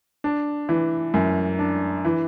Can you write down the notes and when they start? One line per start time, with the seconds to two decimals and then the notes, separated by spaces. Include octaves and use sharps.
0.24 D4
0.69 E3
1.14 F#2
1.59 D4
2.05 E3